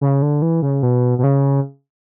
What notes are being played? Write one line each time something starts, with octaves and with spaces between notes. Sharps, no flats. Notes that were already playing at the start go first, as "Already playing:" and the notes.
C#3
D3
E3
C#3
B2
B2
C#3